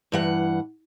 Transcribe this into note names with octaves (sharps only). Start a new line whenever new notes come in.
G2 E3 F#5